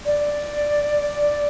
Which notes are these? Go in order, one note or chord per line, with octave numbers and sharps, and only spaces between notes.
D5